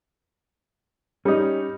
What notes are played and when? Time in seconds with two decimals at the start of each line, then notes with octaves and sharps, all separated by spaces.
1.25 G3 C#4 D#4